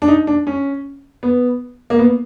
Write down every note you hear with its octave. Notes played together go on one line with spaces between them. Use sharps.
D4
D#4
D4
C#4
B3
A#3
B3